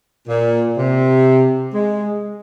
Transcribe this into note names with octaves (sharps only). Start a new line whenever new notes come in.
A#2
C3
G#3